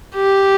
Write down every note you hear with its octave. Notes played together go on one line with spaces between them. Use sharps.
G4